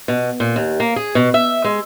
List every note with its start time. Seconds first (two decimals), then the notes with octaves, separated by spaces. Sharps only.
0.08 B2
0.40 A#2
0.56 D#2
0.80 A#3
0.96 G#4
1.15 B2
1.34 E5
1.64 G#3